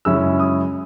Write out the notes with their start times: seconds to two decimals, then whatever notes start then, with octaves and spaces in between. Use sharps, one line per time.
0.05 F#2 C#3 G#3 C#4 E4 E6
0.39 D#6